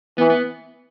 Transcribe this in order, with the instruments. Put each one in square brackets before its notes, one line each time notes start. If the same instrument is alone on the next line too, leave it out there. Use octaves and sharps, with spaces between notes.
[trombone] E3 [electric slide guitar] B3
[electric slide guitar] B3